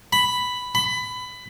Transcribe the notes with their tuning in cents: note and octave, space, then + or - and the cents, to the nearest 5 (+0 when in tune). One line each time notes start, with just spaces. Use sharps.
B5 +5
B5 +20